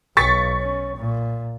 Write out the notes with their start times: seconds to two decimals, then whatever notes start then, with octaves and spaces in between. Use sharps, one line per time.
0.17 B1 C#6 A6 B6
0.60 C#4
0.97 A#2